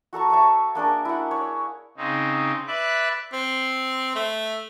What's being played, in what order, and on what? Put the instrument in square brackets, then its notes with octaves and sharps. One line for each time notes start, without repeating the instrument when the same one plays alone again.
[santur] F#4 A4 A#5 C#6
C#5 E5 A5 C#6
A#3 D4 G#4 A#4
E4 F#5
C#5
[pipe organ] C#3 C4 D#4
B4 D5 E5 F#6
[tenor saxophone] C4
A3